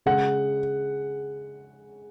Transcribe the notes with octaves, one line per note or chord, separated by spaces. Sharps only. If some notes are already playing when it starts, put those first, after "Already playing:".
C#3 G#3 F#5